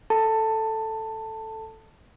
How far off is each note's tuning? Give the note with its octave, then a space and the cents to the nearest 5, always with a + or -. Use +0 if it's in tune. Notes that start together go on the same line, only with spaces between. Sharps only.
A4 +0 A5 +15